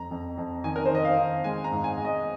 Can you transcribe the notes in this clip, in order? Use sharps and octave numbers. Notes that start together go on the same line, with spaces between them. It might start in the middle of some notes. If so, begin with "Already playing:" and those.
Already playing: F2 A#5
F2
F2
D#3 G#5
A#4
C5
D#3 D#5
F5
D#3
G#3 G#5
A#5
G#2
G#5
G#3
D#5